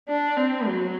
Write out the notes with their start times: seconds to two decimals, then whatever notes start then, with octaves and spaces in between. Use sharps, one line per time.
0.08 D4
0.37 C4
0.67 F#3